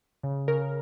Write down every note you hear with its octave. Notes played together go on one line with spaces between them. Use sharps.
C#3
C#3 A#4